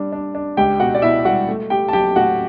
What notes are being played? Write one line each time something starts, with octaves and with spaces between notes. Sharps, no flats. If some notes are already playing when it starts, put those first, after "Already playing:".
Already playing: G3 D4
D4
D4
C#2 G4 G5
B2 F#4 F#5
D5
B2 E4 E5
G3 F#4 F#5
A3
A3 G4 G5
A5
F#3 G4 G5
A2 F#4 F#5